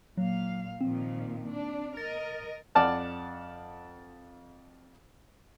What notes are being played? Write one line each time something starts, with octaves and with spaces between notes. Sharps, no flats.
A#2 F#3 F5
A#2 D#3 F3 C4
D4
A#4 D#5 A6
F2 D5 F#5 A5 F6